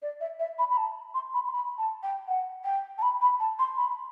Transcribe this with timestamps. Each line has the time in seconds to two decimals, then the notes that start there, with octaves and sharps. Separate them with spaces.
0.02 D5
0.21 E5
0.39 E5
0.59 B5
0.70 B5
0.77 A5
1.14 C6
1.34 B5
1.47 C6
1.52 B5
1.78 A5
2.03 G5
2.28 F#5
2.65 G5
2.98 A5
3.02 B5
3.21 B5
3.40 A5
3.59 C6
3.77 B5